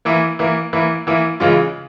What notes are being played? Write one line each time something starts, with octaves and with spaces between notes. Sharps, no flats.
E3 A#3 E4
E3 A#3 E4
E3 A#3 E4
E3 A#3 E4
C#3 E3 G#3 C#4 F4